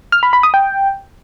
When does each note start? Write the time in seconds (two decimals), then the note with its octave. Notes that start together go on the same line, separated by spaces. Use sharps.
0.12 F6
0.23 B5
0.33 B5
0.43 D#6
0.54 G5